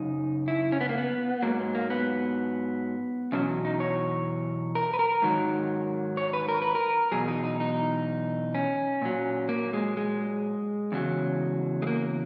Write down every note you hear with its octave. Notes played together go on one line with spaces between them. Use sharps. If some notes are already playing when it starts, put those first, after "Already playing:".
Already playing: F#2 C#3 D#4
E4
C#4
B3
A#3
B3
G#2 F#3 A#3
A#3
B3
E2 B2 F#3 C#4
D#4
C#5
A#4
B4
A#4
G#2 D#3 F#3
C#5
B4
A#4
B4
A#4
E2 B2 F#3 G#4
D#4
D#4
D#4
C#4
A#2 F#3
A#3
G#3
G#3
E2 C#3 F#3
G#3
A#3